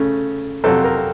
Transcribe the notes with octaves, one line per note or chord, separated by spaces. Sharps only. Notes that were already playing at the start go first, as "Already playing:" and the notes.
Already playing: C#3 A3 C#4
F2 C3 F#3 C4 A4
A#4